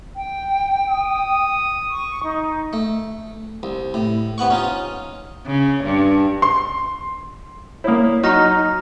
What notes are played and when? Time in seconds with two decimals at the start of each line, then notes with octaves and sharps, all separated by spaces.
0.16 G5
0.89 D#6
1.90 C#6
2.24 D#4
2.73 A3
3.63 C2
3.94 A2
4.38 C3 B3 F#5 C#6
4.50 C#4 D#4 F4
5.46 C#3
5.85 G2
6.42 C6
7.84 A#3 E4 C#5 D5 D#6
8.23 F#3 D#4 A#5 C#6 F6 A#6